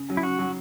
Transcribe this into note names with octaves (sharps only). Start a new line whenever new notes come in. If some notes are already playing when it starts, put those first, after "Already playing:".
Already playing: C#3
F#3 C#4
E4
C#3 F#4
F#3 C#4